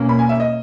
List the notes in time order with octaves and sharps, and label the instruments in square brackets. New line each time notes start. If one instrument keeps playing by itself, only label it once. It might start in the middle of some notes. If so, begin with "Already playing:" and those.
Already playing: [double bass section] B2 A#3 C#4
[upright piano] B5
G#5
E5
D#5